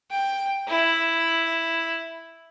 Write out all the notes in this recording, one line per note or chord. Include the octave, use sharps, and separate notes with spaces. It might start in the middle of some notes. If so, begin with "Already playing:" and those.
G5
E4